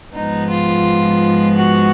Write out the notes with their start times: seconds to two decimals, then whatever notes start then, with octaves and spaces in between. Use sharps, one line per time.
0.14 G#2 F3 G#3 B3 D#4
0.50 F4
1.56 F#4